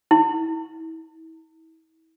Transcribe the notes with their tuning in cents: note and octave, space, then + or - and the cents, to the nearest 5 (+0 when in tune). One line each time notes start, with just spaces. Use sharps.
E4 -40